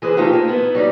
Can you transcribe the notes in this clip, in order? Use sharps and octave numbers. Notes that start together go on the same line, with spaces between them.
E3 G#4 B4 C5
A3 D#4 F4 G4
A#3
B3 E4
F#3 G3 D#4